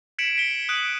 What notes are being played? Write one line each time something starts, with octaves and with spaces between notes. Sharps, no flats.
G#6 B6 C#7 D7 E7 F#7
B6 G7
D#6 F#6 D7 D#7 F#7